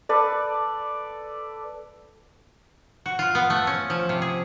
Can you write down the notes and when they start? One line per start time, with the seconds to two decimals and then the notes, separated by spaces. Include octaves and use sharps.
0.09 A4 B4 D5
3.06 F#4
3.19 F4
3.35 B3
3.50 A3
3.67 C#4
3.90 F3
4.09 C3
4.22 G#4